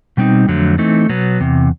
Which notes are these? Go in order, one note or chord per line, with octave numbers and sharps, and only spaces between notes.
B2 G3 C4 D#4
F2 D3 F#3 A3
E3 A3 C4 D#4
B2 F#3 B3
E2 C3